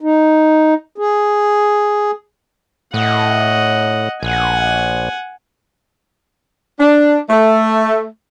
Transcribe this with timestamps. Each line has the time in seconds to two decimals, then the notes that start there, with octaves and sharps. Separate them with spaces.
0.01 D#4
0.98 G#4
2.94 A2 D#5 F#5
4.23 A#1 F#5 G#5
6.80 D4
7.30 A3